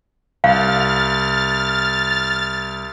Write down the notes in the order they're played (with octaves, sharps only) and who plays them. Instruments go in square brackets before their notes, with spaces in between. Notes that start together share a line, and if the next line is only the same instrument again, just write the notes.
[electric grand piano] C2 [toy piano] F5 [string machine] F6 A6